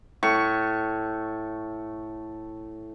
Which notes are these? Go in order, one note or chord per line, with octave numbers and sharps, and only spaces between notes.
A2 C#6